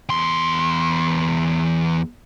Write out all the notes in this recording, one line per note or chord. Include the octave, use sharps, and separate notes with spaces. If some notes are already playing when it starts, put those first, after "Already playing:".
E2 C6